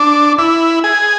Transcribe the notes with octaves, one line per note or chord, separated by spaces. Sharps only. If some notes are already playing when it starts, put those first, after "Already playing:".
Already playing: D4
E4
G#4